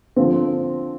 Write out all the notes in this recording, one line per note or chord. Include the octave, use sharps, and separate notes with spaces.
D3 F3 C4